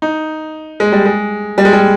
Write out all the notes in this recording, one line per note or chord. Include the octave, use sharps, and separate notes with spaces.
D#4
G#3
G3
G#3
G3
G#3
G3